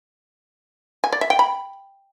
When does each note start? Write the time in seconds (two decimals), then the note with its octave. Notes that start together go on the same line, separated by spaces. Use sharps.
1.04 G#5
1.12 D5
1.21 E5
1.30 G5
1.39 B5